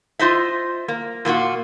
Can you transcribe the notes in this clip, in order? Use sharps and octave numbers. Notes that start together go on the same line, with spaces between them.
F4 C5 D#5 E5
A#3
A#2 A#3 F4 F#4